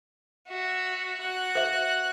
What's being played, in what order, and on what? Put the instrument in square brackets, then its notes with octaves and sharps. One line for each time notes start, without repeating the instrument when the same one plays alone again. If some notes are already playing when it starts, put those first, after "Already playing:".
[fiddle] F#4 E5
F#4 F#6
[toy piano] C5 E5